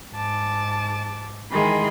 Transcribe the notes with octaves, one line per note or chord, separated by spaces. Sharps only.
G#2 A5 D6
D#3 E3 G#3 G#4 B5 C6